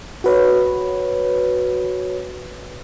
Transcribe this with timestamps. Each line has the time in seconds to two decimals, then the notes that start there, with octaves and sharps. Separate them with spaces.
0.24 F#4 B4 C#5